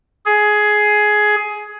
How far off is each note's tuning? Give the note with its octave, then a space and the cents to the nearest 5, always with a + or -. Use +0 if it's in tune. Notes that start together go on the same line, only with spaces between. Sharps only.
G#4 +15